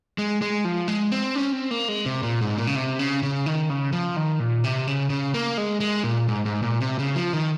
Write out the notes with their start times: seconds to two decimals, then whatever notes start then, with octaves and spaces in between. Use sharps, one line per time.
0.18 G#3
0.42 G#3
0.65 F3
0.88 G#3
1.11 C4
1.36 C#4
1.52 C4
1.71 A#3
1.88 G#3
2.06 C3
2.23 A#2
2.41 G#2
2.58 A#2
2.67 C#3
2.76 C3
2.99 C#3
3.23 C#3
3.46 D#3
3.70 C#3
3.93 F3
4.16 D#3
4.40 A#2
4.64 C3
4.87 C#3
5.10 C#3
5.34 A#3
5.58 G#3
5.80 G#3
6.04 A#2
6.28 G#2
6.46 G#2
6.62 A#2
6.80 C3
6.99 C#3
7.15 F3
7.33 D#3